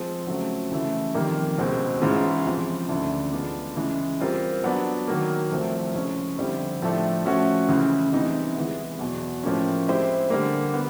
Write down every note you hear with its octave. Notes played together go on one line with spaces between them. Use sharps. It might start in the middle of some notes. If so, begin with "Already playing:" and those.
Already playing: F3 G#3 C4
C#3 F#3 A3 C4
C#2 C#3 E3 A3
F2 C3 D#3 G3 A#3
C#2 B2 G#3 C4
G#2 E3 G#3 C#4 F4
C#2 C3 F3
D2 C#3 E3 A3 D4
G#3 B3 D4 F4
C#3 E3 G#3
G3 C4 F4 A#4
F#3 B3 D4
D#3 F#3 A#3
C2 C3 F3 A3 C4
C#2 C#3 F3 G#3 C#4
F2 D3 G3 C4 E4
A2 F3 A3 D4
F3 A3 C#4 F#4
C#2 C#3 E3
C3 E3 G3 B3 D#4
E3 G#3 B3 E4
E2 B2 F#3
A2 F3 A#3 C#4
G#3 C4 E4 G4 C5
D3 G3 A#3
B3